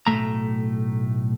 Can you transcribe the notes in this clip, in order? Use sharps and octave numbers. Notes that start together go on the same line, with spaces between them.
B1 A2 A3 A#5